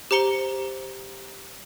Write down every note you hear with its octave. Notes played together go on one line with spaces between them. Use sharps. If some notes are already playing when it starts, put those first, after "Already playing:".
G4 C5 A#5 C#7 G7